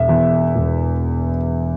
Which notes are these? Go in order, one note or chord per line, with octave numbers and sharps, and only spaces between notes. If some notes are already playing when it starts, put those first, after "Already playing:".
Already playing: E1 E5
E2
E1